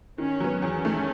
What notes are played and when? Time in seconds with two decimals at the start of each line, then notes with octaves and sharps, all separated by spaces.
0.18 D#3 C#4
0.40 F#3 B3
0.62 E2 C#4
0.85 D#3 A3